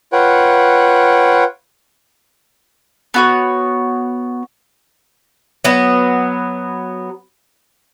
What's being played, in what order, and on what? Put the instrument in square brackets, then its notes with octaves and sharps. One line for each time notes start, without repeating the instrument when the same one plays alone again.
[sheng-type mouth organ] F4 B4 C#5 F#5 G5
[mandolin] B3 F#4 C#5
[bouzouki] F#3 B3